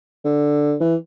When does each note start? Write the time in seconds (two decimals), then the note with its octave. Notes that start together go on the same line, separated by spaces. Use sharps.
0.24 D3
0.80 E3